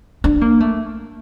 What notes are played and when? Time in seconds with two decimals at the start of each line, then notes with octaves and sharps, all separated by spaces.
0.24 D4
0.41 A#3
0.60 A3